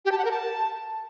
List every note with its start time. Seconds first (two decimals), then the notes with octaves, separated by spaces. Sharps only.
0.05 G4
0.12 A5
0.18 F#5
0.25 A#4
0.31 A5